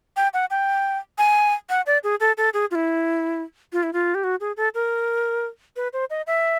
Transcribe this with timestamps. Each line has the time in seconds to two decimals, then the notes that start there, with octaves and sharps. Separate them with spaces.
0.17 G5
0.34 F#5
0.50 G5
1.18 G#5
1.69 F#5
1.86 D5
2.04 G#4
2.20 A4
2.38 A4
2.54 G#4
2.71 F4
2.75 E4
3.73 F4
3.83 E4
3.93 F4
4.15 G4
4.24 F#4
4.40 G#4
4.57 A4
4.75 A#4
5.76 B4
5.93 C5
6.10 D#5
6.27 E5